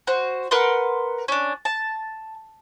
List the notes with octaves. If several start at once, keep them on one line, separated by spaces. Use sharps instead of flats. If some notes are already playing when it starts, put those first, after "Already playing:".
F#4 C5
A#4 B4 F#5 C6
C#4 D4
A5